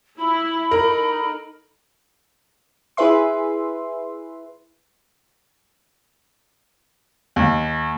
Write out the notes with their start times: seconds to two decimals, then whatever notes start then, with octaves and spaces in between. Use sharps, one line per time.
0.18 E4 B5
0.71 D#4 A4 A#4
2.97 E4 G#4 B4 E5 C6
7.36 D#2